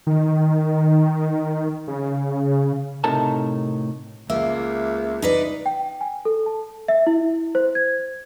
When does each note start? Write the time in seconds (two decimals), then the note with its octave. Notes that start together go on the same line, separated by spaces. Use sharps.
0.07 D#3
1.88 C#3
3.04 A2 C3 D#4 A4 A#4 A5
4.30 C#2 A#3 E5
5.22 D#4 B4 D5
5.66 G5
6.01 G#5
6.25 A4
6.46 A5
6.88 E5
7.07 E4
7.55 C5
7.75 G#6